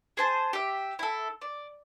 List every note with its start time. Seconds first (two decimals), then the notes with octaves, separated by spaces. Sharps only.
0.17 G#4 C5 A5
0.53 G4 E5
0.99 E4 A4
1.42 D5